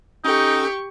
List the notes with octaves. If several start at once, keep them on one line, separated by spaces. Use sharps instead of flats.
C#4 D#4 G4 A4 C#6